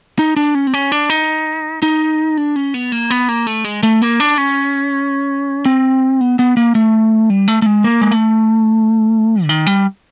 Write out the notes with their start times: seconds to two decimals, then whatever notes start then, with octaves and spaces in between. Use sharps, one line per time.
0.19 D#4
0.36 D4
0.55 C#4
0.67 C4
0.74 C#4
0.92 D4
1.10 D#4
1.83 D#4
2.37 D4
2.56 C#4
2.74 B3
2.92 A#3
3.10 B3
3.29 A#3
3.47 A3
3.64 G#3
3.83 A3
4.02 A#3
4.20 D4
4.38 C#4
5.66 C4
6.21 B3
6.39 B3
6.57 A#3
6.75 A3
7.30 G3
7.48 A3
7.62 A3
7.66 G#3
7.84 A#3
8.01 G#3
8.12 A3
9.44 D3
9.49 D#3
9.67 G3